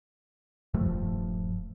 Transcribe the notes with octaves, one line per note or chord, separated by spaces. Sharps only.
D#1 G2 F3 A3